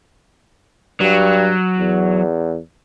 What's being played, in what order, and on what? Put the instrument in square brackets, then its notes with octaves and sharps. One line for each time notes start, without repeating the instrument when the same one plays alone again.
[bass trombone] G2 [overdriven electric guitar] F#3
[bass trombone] E2